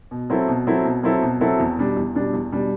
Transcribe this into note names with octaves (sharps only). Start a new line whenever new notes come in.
B2
F#3 C4 E4 A4
B2
F#3 C4 E4 A4
B2
F#3 C4 E4 A4
B2
F#3 C4 E4 A4
E2
B2 G3 D4
E2
B2 G3 D4
E2
B2 G3 D4